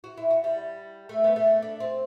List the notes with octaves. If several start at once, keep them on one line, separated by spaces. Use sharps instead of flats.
F#4
E4
F#4
G3
A3
B3
A3
D4
C4